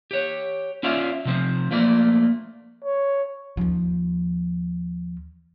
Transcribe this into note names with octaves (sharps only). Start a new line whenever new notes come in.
G4 C#5
C#4 F4 D5 E5 F5
C3 F3 C4
F3 A3 A#3 D5
C#5
D#2 F3